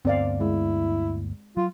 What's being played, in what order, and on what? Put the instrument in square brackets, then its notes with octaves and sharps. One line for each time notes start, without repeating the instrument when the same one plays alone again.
[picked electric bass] D2 G2 B3 [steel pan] C4 D5 F5
[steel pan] G#3 [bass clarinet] E4
[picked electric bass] F#3 [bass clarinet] F4